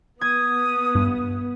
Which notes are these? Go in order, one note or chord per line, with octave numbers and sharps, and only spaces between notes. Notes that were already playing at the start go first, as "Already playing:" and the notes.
B3 D#6 G#6
G2